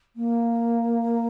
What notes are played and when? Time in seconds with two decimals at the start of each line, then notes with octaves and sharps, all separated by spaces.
0.16 A#3